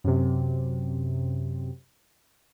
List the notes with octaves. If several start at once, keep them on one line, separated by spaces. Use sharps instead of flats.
F#2 C3